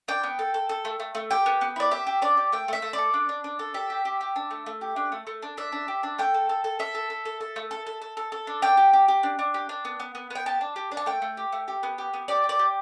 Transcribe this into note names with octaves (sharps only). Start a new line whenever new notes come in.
D4 G5
B3
A4
A4
A4
A3
A3
A3
G4 G5
B3
B3
E4 D5
G4 E5
G4
D4 D5
G4
A3 G5
A3 E5
A3
D5
A4
D4
D4
D4
A4
G4 E5
G4
G4
G4
D4
A3
A3
G4
D4
A3
A3
D4
D4 E5
D4
G4
D4
A3 G5
A4
A4
A4
A4 E5
A4
A4
A4
A4
A3
A4
A4
A4
A4
A4
D4
D4 G5
G4
G4
G4
D4
D4
G4
D4
B3
B3
B3
B3 G5
G4 A5
D4
G4
D4
A5
A3 G5
A3
G4
A3
G4
B3
G4
B3
G4 D5
G4
D5
G4